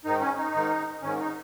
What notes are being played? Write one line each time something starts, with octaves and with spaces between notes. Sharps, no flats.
G#2 D#3 D#4
C#4
D#4
G#2 D#3
G#2 D#3 C#4
D#4